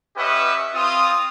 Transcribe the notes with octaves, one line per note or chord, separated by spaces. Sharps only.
C#4 G4 B4 D#5 E5 F#5
C4 F4 D#6